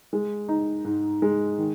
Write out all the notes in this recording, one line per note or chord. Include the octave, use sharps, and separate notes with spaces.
G#3
D#4
G#2
G#3
D#3